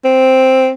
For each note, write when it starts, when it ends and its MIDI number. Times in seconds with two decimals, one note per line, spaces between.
0.05 0.70 60